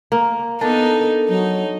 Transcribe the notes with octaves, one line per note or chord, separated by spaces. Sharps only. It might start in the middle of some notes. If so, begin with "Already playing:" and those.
A#3
B3 D4 D#4 A4 A#4
F#3 D#4